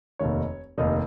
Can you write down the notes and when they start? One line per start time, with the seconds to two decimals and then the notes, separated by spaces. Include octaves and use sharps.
0.19 F1 D#2 D#3 C#5
0.78 F1 D#2 D#3 D#4 D#5